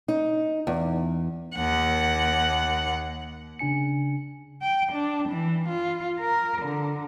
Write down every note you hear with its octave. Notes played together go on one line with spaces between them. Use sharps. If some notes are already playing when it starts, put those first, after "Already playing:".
D#4
E2
D#2 F#5
C#3 D4 G#5 C#7
G5
D4
E3
F4
A#4
D3